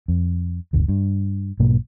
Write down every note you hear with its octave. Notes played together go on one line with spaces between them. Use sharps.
F2
D1 G1 D2
G2
B1 G#2 B2 A#3